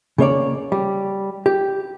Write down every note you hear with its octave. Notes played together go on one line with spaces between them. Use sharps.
C#3 A#3 C#5 D5
G3
G4